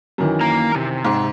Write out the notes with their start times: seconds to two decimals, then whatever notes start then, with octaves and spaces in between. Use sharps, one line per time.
0.18 F#2 D#3 E3
0.41 A#3 A#4 A#5
0.75 C3
1.05 G#2